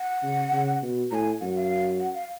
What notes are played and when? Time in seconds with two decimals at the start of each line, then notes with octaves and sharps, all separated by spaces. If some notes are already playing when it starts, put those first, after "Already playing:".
Already playing: F#5
0.23 C#3
0.52 C#3
0.82 B2
1.11 A2 G#5 A#5
1.40 F#2 F#5
1.56 F5
2.00 F#5
2.14 F5